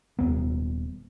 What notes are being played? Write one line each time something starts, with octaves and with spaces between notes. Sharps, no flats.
D#1 D#2 G3 B3